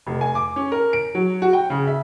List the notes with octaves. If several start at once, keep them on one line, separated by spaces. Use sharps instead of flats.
F1
G#5
D6
C#4
A#4
D7
F#3
F#4
G5
C#3
E5